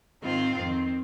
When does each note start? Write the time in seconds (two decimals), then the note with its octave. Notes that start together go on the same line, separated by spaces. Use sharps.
0.23 G#2 D#3 C4 F4
0.55 F2 D#3 C4